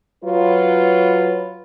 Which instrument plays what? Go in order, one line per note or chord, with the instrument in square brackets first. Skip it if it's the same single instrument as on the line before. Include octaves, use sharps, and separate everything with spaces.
[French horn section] F#3 F4 B4